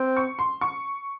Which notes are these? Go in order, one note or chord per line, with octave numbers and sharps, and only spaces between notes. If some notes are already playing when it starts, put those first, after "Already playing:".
Already playing: C4
C#6
C6
C#6